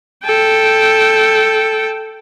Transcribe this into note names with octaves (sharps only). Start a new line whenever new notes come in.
A4 G5